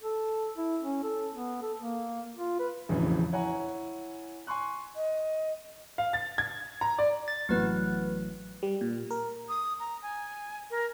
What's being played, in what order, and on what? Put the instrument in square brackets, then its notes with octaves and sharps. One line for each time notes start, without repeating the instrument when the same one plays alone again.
[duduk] A4
E4
C#4
A4
B3
A4
A#3
F4
B4
[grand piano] E1 A#1 F2 A2 C#3 E3
E4 C#5 F#5 G#5 A#5
G#5 C6 C#6 F#6
[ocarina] D#5
[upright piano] F5
A6
G#6
A#5
D5
[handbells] A6
[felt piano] A1 F#3 [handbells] B3 B4
[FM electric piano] G3
A#2
A#4
[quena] D#6
A#5
G#5
A#4